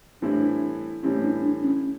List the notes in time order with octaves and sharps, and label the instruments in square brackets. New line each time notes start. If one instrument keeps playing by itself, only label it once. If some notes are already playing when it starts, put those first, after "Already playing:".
[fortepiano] A2 E3 G3 C4 E4 [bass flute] D4
[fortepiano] A2 E3 G3 C4 E4 [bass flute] C#4
[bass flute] D4
D4
C#4